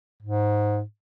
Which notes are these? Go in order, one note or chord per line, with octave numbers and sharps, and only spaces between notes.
G#2